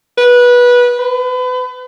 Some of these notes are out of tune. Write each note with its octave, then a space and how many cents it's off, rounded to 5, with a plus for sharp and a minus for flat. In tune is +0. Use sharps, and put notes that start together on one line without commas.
B4 -20
B4 +35